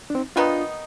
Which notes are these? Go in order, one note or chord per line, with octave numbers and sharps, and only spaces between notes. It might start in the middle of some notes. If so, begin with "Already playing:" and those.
D4
C4 D#4
D#3 B3 D4 D#4 F4